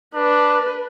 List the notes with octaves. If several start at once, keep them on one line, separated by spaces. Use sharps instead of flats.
D4 B4